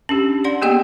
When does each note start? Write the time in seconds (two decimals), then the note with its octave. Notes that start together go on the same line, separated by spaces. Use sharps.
0.09 C#4 D4 G4
0.44 D5 F#5 C6
0.62 A#3 B3 G4 G#4 D#5 G5